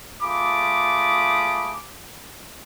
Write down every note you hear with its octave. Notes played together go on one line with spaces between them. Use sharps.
A3 F4 G#4 B5 D6 D#6